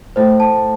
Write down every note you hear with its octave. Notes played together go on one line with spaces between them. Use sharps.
A2 C5
A5